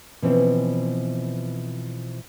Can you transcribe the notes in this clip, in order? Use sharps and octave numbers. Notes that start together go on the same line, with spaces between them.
B2 E3 F3 C4 C#4